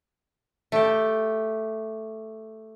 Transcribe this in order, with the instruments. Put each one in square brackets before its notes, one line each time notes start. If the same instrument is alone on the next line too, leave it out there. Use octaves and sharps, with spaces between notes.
[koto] A3 G4